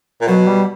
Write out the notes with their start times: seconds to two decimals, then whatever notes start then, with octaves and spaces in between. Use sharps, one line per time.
0.21 A#2
0.27 B2 F#3
0.47 G3